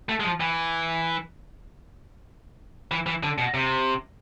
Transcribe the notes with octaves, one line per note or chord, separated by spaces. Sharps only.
A3
G#3
F3
E3
E3
E3
D3
B2
C3